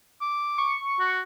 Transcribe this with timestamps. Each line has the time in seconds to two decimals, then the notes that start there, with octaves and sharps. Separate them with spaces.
0.21 D6
0.58 C#6
1.00 F#4